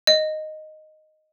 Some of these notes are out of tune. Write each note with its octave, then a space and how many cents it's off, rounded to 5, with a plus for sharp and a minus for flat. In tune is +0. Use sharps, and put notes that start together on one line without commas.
D#5 -5